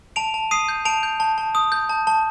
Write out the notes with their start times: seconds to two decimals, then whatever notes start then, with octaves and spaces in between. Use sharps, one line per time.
0.16 A5 D7 F7
0.34 A5
0.51 D#6 C7 D#7
0.69 G6
0.85 A5 D7 F7
1.03 G6
1.20 A5
1.38 A5
1.55 D#6
1.72 G6
1.89 A5
2.07 A5